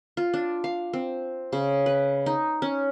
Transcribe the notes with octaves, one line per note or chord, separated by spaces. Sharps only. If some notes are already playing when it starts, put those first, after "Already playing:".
F4
D4
F5
C4
C#3
B4
D#4
C#4